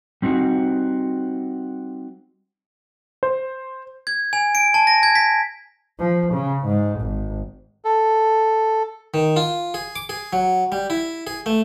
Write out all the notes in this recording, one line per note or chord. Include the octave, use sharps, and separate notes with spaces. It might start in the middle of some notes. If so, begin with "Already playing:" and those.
G3 C4 D#4 F#4
C5
G#6
G#5
D7
A5
A#6
G#6
B6
F3
C#3
G#2
G#1
A4
D#3
F4
G#4
D6
G#4
F#3
G3
E4
G#4
A3